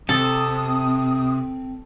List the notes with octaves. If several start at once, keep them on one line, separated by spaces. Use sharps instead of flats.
C3 C4 A4 D#6